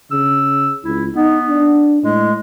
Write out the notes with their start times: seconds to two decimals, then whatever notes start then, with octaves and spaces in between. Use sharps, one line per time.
0.11 C#3 E6
0.84 C#2 E4
1.15 B3 D#4
1.50 D4
2.03 A2 G#3